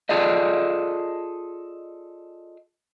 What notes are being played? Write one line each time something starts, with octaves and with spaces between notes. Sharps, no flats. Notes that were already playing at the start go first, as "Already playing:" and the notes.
F4 G#4 A4 D5 D#5